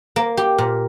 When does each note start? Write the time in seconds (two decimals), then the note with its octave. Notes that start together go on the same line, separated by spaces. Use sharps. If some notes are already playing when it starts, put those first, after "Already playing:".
0.16 A#3
0.37 G4
0.58 A#2